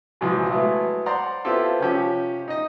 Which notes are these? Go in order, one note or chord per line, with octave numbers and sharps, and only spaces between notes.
A#1 C3 E3 F#3 G#3
F#3 G#3 A3 B3 E4
C5 D5 F#5 A#5 C6
B3 C4 E4 F4 G4 A4
C3 F3 C#4 G4
D#4 D#5